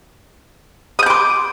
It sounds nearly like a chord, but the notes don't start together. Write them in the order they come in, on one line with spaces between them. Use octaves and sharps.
D#6 G6 D6 C6